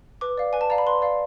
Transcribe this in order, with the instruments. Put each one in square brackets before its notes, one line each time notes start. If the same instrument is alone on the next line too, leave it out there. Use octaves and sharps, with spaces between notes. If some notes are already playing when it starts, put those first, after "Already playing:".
[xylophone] B4 D6
D5 F5
B4 G#5
A5
D5 F5 A#5
B5
B4 C6
D5 F5